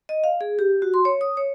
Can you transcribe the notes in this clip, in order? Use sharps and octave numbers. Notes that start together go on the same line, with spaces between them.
D#5
F5
G#4
G4
F#4
C6
C#5
D#6
C#5